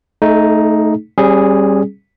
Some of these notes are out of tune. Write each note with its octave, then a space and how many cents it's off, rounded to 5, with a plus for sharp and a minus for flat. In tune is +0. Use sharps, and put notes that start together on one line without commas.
A3 +0 D#4 +0 G#4 +45
G3 +0 C#4 -35 G#4 +0